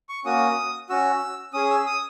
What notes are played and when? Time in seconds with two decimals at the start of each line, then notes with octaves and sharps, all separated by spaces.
0.09 C#6
0.25 A#3 C#4 F#4 D#6
0.89 C#4 F#4 E6
1.53 C#4 G#4 D#6
1.71 E6
1.86 D#6